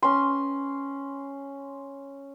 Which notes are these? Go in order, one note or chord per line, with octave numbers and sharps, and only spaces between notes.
C#4 C6